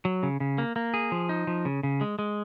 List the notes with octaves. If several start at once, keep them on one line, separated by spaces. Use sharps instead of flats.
F#3
C#3
C#3
A#3
A#3
G#4
F3
D#4
F3
C#3
C#3
G#3
G#3